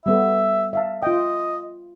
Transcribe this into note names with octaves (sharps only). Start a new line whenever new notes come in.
G3 B3 A4 E5
E5 F5 A5
F4 D#5 G5